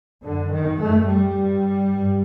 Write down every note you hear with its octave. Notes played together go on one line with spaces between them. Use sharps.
F#2 D3
D#3
F#2 A3
G3
G2
G2